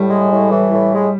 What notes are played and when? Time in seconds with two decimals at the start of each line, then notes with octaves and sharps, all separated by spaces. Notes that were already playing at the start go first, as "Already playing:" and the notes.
Already playing: A2 G3
0.10 G#3
0.32 A2
0.52 E3
0.72 A2
0.93 G#3